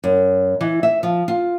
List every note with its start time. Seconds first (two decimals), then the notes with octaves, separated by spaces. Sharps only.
0.04 F#2
0.61 E3
0.83 E5
1.03 F3
1.28 F4